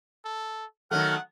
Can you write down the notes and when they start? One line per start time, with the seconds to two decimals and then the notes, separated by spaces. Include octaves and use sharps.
0.25 A4
0.91 D#3 F#3 A3 F#5 F6